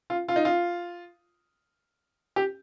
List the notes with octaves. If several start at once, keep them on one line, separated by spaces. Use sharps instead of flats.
F4
F4
D#4
F4
G4